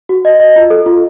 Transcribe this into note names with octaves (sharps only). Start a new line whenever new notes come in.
F#4
D#5
D#5
F4
A4
F4